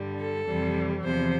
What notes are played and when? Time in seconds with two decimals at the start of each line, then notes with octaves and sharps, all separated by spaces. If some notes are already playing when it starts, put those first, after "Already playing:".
Already playing: G2 D3 G3
0.19 A4
0.47 F2 C3 E3 G3
1.04 E2 C3 F3 C5